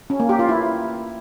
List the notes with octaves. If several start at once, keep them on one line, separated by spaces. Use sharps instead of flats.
C#4
A#3
G4
F4
E4